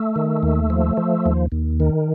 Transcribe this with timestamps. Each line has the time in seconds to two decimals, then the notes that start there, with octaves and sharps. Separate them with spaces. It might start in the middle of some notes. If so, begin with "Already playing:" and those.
Already playing: A3
0.16 D#3
0.43 D#2
0.70 F3
0.97 F3
1.26 D#2
1.52 D#2
1.80 D#3